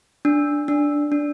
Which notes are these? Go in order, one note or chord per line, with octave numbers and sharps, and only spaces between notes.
D4
D4
D4